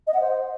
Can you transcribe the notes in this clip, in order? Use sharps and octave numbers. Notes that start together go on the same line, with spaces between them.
D#5
F#5
C5